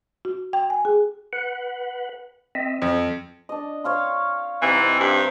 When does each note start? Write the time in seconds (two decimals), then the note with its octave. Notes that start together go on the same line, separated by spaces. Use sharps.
0.25 F#4
0.53 G5
0.70 G#5
0.85 G#4
1.33 B4 F#5
2.55 C4 D#5 E5
2.82 F2 F3
3.49 D4 D#5
3.84 C#5 F5 C6
4.62 C3 E3 D#4
4.77 C4
5.00 G2